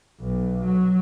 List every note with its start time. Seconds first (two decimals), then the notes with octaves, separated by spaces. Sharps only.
0.21 B1
0.65 F#3